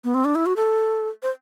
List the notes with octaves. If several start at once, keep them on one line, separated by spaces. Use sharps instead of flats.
B3
C4
D4
E4
F#4
A4
C5